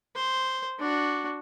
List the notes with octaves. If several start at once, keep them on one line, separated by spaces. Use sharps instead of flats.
C5
D4 F#4